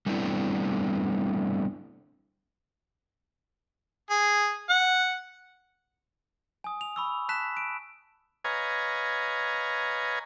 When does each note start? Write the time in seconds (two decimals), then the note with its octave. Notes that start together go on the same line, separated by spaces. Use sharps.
0.06 G3 A3 B3 C4 D4 E4
4.10 G#4
4.70 F#5
6.64 G#5 D#6
6.81 F7
6.96 B5 C#6 E6
7.29 A5 F#6 B6 E7
7.57 D7
8.44 B4 C#5 D#5 F5 G#5 A#5